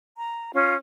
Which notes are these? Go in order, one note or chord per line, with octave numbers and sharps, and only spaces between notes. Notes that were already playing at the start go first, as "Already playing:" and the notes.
A#5
C#4 F4